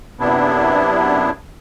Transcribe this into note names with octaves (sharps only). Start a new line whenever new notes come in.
F#2 C3 B3 D4 E4